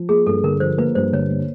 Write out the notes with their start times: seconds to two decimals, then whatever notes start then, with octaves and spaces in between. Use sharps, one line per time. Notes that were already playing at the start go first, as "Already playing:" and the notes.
Already playing: F3
0.09 A#3 G#4
0.27 G2 A4
0.43 D3 A#4
0.60 F3 C5
0.78 A#3 B4
0.95 G2 C5
1.13 D3 C#5
1.30 A#3